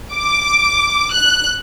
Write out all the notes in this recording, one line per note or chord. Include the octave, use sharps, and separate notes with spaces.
D6
F#6